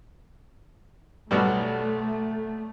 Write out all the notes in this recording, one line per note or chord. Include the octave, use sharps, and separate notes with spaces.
B1 B2 G3 A3